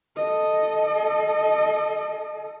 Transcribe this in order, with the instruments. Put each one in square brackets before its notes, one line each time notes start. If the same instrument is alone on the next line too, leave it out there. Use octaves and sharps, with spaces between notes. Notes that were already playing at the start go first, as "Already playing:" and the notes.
[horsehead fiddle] A4 D#5